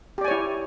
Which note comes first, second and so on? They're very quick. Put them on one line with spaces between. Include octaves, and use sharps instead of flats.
G4 D5 G#5 C#5 E4